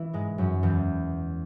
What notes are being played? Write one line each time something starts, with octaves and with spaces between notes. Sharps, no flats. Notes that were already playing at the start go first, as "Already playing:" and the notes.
Already playing: E3 E4
G#2 G#3
F#2 F#3
E2 E3